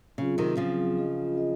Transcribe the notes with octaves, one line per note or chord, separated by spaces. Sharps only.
C#3 F#3 C4 F4 G#4
C3 D#3
C#3 F3 F#3 C4 F4 G#4
C#4 F4 G#4 D#5
C#4 F4 G#4 D#5